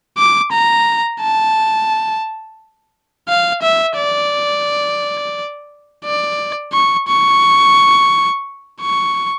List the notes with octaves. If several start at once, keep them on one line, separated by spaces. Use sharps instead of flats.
D6
A#5
A5
F5
E5
D5
D5
C#6
C#6
C#6